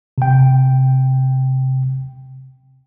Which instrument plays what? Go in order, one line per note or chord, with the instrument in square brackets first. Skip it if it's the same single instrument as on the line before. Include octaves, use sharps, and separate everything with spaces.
[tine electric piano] C3 G5